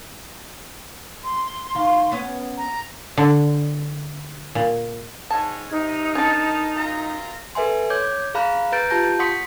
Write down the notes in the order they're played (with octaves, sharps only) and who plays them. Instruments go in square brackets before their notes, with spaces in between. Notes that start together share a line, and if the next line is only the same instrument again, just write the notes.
[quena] C6
[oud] D#3 F5
B3 C#4
[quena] A#5
[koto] D3
A#2
[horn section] G#2 C#5 [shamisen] A5
[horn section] C3 [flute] D#4
[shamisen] C#4 D4 [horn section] A#4 D#5 A5
[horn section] F#2 F4 A#5
[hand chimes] A4 B4 E5 G#5 C6
C#5 D6 G6 G#6
G#4 F5 A#5 B5 F#6
B4 A#5 F#6 G6 A6 D7
F4 G4 A5 G6 A#6
F#5 C6 C#6 D#6 B6 C#7